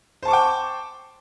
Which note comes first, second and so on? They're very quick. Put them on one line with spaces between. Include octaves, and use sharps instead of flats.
C5 A5 C#6 D6 G5